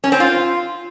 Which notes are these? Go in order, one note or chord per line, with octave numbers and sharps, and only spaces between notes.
C#4
C4
F4